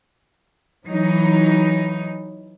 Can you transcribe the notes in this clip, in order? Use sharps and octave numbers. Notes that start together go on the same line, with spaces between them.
E3 F#3 D#4